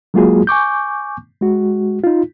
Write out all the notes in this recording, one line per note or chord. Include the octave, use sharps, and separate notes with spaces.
F#3 G#3 A#3 F4 F#4 G#4
G#5 C#6 D6 G6
G#3 F#4
D#4 F4